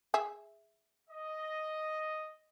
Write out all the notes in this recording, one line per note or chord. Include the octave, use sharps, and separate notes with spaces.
G#4 E5
D#5